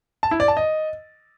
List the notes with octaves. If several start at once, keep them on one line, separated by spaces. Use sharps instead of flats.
A5
E4
D5
A5
D#5